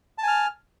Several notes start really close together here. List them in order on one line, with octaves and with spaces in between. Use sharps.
A5 G#5 F6